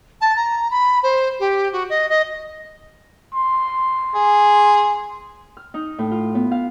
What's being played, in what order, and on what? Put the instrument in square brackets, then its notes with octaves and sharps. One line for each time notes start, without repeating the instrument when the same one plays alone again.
[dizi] A5
A#5
B5
C5
G4
F#4
D#5
D#5
[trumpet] C6
[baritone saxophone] G#4
[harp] F6
D#4
A2
F4
B3
F5